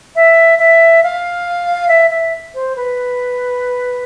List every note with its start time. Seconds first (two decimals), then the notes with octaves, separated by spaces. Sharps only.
0.16 E5
0.59 E5
1.03 F5
1.88 E5
2.10 E5
2.54 C5
2.76 B4